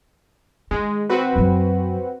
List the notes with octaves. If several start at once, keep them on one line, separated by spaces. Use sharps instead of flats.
D#3 G#3
C4 F#4 B4
F#2 F#3